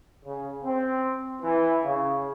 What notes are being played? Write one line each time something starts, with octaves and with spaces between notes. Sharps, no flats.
C#3
C4
E3
C#3